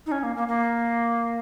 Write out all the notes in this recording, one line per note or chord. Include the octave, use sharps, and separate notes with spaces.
D#4
C#4
A#3
A#3
A#3